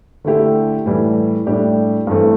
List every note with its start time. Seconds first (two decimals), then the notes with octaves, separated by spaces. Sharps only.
0.24 D3 A3 E4 G4
0.86 A2 E3 G3
1.46 A2 G3 D4 G4
2.07 G2 E3 A3 C4